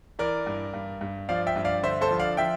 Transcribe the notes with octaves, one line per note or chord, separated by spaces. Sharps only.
E3 A#4 D5
G2
G2
G2
F3 D5 F5
E5 G5
G2
D5 F5
D3 C5 E5
A4 C5
F3
D5 F5
F3 E5 G5